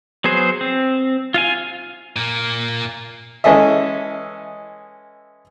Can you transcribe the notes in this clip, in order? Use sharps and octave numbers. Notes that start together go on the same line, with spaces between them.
F#3 B3 G#4 C5
C4
F4 F5 G#5
A#2 A#3
E3 G#3 C#4 A4 D#5 E5